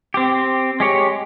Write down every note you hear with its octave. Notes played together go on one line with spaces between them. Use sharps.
C4 G4
G#3 G4 C#5